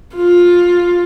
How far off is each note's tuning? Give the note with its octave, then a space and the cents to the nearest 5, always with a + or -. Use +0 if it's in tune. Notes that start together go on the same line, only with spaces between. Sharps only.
F4 +10